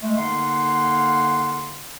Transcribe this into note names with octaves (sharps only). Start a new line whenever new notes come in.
G#3 A3
D3 A#3 D#4 F5 F#5 C6